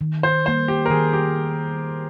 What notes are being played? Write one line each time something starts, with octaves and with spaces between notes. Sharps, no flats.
D#3
C5
G3 A#3 C5
G4
A#4
D#3 G#4
G4